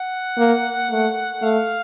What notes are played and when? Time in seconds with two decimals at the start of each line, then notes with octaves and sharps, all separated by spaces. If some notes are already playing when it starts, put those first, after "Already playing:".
Already playing: F#5
0.38 A#3
0.91 A3
1.42 A3 F5